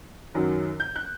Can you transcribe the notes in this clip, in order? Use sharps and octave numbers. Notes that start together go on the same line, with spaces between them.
F#2 D#3 F#3
G6
F#6